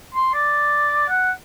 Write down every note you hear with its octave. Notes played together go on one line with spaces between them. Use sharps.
C6
D5
F#5